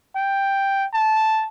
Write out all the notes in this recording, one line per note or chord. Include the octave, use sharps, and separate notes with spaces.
G5
A5